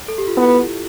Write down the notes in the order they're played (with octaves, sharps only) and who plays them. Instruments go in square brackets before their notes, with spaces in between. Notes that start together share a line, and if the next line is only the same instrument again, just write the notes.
[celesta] A4
G4
F4
[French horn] B3 [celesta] E4